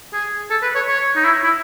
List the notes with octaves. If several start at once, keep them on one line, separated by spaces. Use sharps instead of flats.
G#4
A4
B4
C#5
C#5
D#4
E4
E4